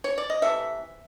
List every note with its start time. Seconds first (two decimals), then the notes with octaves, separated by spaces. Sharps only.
0.04 C#5
0.18 D5
0.30 D#5
0.42 C3 E3 A3 E5